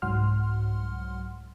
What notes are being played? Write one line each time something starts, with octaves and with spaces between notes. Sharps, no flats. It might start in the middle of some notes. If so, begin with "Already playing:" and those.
C2 G#2 F#3 F#5 C6 F6